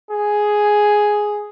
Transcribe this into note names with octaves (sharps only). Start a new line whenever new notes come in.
G#4